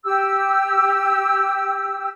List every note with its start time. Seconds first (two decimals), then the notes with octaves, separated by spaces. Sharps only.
0.04 G4 E6